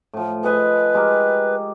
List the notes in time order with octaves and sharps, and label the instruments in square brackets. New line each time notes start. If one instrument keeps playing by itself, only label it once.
[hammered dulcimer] A2 F3
[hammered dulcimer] G#4 D#5 G#5 [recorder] B4
[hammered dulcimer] G#3 G4 A#4